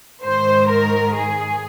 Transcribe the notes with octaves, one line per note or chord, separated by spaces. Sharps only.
G#2 D#3 C5
A#4
G#4